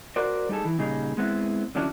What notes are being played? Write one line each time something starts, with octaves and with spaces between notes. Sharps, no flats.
F#4 A#4 C5 D5
G3 D#4 G#4 A4
E3
A#2 C#3 G3 D#4 G#4
G#3 B3 C4 E4
D3 F3 F#3 C#4 D4 E4